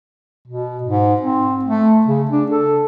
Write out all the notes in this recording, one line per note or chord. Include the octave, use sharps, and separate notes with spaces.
B2
G#2
C4
A3
C#3
D4
A4